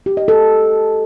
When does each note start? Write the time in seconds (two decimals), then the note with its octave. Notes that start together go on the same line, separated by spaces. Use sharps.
0.06 G4
0.17 D#5
0.28 A4